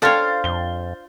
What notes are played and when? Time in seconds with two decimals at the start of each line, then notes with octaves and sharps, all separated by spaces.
0.02 D4 F4 A4 C5 C#5 F5 G5 A6
0.44 F2 G7